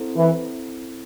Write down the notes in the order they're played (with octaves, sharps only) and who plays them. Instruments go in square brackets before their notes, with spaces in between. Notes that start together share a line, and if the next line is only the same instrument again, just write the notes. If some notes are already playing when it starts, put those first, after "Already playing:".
Already playing: [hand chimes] C4 E4 A4 C5
[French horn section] E3